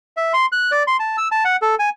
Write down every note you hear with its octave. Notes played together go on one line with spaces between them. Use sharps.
E5
C6
F#6
D5
C6
A5
E6
A5
F#5
A4
G#5